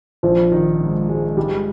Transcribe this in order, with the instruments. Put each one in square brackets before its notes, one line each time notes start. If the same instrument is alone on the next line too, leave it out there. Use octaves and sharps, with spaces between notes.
[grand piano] A#1 [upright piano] F3
[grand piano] D#3
G#2
G#3
[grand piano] G#2 [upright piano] G3